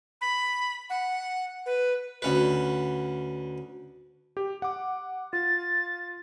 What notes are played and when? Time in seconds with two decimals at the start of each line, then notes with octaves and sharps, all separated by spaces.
0.21 B5
0.90 F#5
1.66 B4
2.22 D2 C#4 B4
4.37 G4
4.62 F#5 D6
5.33 F4 A6